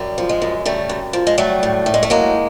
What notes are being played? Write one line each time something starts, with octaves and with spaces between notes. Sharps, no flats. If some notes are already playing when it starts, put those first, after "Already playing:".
Already playing: F#2 G3
F3
G#3
F#2
C#3 G3 A3
F#2
F3
G#3
F#3 G3 A3
A2
A2
G#3
A3
F#3 G#3 A#3